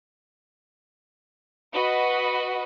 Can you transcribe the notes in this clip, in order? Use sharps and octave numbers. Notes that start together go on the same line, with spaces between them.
F#4 B4 D#5